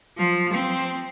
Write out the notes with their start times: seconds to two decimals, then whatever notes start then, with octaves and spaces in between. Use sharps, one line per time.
0.17 F3
0.53 C4